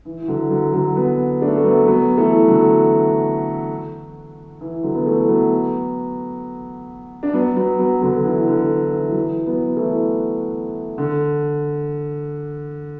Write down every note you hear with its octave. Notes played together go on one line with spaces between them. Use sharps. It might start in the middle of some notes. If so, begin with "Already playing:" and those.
E3
E3
D3 F#3
D3 F#3
D3 F#3
F#3 B3
A3 D4
A3
F#3 B3
F#3 B3
E3 A3
D3 F#3
E3
D3 F#3
B3
E3 A3
F#3 B3
D4
F#3 B3
F#3 B3
F#3 B3
D3 F#3
D3
E3
D3
E3
E3
F#3
E3
F#3 B3
E3 A3
D3